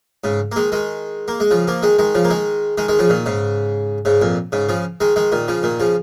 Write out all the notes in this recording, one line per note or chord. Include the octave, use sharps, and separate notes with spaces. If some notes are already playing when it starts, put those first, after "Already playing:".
G#2 C#3
A#3
D#3 G#3
D#3 G#3
A#3
G#3
C#3 F3
F3 A#3
D#3 G#3
D#3 G#3
C#3 F3
A#3
D#3 G#3
D#3 G#3
D#3 G#3
C#3 F3
A#2 D#3
G#2 C#3
G#2 C#3
F2 A#2
G#2 C#3
C#3 F3
D#3 G#3
D#3 G#3
A#2 D#3
C#3 F3
A#2 D#3
C#3 F3